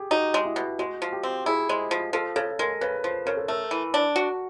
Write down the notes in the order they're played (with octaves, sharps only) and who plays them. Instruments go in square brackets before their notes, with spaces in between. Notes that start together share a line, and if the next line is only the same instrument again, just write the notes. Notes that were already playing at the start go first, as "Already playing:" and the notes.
Already playing: [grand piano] G4 G#4
[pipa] D#4 [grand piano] F#4
[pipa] G#3
[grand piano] E4
[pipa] B2
[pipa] G#3 [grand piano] F#4
[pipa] F3
[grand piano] G4
[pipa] C4
[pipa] E4 [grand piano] G#4
[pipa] G#3 [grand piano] C5
[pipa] F3
[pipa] F3 [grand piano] A4
[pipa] C#3 [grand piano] A4
[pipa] G#3 [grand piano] A#4
[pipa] C#3 [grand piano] B4
[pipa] F3 [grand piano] C5
[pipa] C#3 [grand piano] A#4
[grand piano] A4
[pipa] A3 [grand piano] A#4
[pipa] E3
D4
F#4